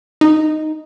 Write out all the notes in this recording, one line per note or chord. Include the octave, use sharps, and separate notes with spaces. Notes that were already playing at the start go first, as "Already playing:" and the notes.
D#4